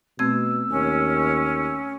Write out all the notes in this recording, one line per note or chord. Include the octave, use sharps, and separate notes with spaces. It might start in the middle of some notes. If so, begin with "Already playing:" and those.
B2 A3 C4 E6 G#6
D#2 C#4